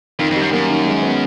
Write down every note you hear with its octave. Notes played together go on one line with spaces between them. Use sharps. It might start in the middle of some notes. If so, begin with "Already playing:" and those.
F2 D#3
F2 G3
F#2
F#2 A#3
D#3
G#3
B3